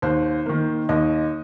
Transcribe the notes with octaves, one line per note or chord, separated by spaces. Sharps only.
D#2 C5
D#3 A#3
D#2 D#5